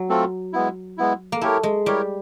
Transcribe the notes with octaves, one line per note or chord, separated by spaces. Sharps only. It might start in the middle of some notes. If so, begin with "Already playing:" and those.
Already playing: F#3
A3 C4 F4 A4
G#3 B3 E4
G#3 B3 E4
A#3
A3 E4 G4 A#4 C#5
G#3
G3 E4 G4 A#4 C#5